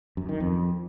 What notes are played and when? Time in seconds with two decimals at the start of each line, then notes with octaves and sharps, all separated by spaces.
0.17 F#2
0.29 D#3
0.40 F2